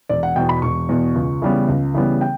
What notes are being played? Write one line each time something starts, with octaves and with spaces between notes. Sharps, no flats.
E1 D5
F#5
E2 B2 G5
B5
E1 C#6
E2 B2
C#2
C#3 E3 G3 B3
C#2
C#3 E3 G3 B3
G5